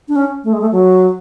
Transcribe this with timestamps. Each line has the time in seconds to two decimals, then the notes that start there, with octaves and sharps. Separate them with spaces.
0.08 D4
0.16 C#4
0.44 A3
0.53 G#3
0.61 A3
0.72 F#3